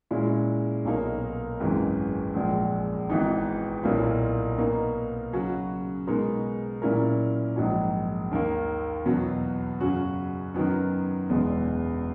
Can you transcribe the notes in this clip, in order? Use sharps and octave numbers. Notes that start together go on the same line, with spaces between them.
A#2 G#3 C#4 E4
B1 B2 A#3 D#4 A#4
G#1 F#2 E3 G#3
A#1 A#2 G#3
G#1 G#2 E3 B3 D#4
B1 A#2 F#3 A#3 E4
B2 A#3 D#4 A#4
C#3 F#3 C#4 F#4
B2 G#3 D#4 A#4
A#2 F#3 C#4 E4 A#4
A#1 G#2 F#3
D#2 D#3 A#3
E2 B2 F#3
F#2 C#3 F#3 C#4 F#4
F#2 D#3 F#3 B3
E1 E2 B2 G#3 B3